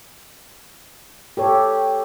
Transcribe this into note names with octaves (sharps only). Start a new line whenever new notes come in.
G4 A4 C#5